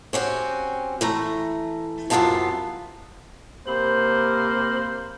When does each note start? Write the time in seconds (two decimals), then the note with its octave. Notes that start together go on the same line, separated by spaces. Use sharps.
0.13 C4 C#4 F#4 G4
1.01 E3 A3 A#5
2.10 F#2 C3 D#3 B3 F4 A5
3.67 C3 A#3 C5 B5